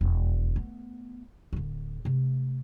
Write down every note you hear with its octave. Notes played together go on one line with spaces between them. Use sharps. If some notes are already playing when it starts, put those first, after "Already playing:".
E1 F2
A3 B3
D1 D3
C3 A3